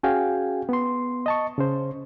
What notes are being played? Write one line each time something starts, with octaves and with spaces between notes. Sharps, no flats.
C#4 F#4 G#4 F5 G5 G#5
B3 C6
D#5 A5 C#6
C#3 C#4 C5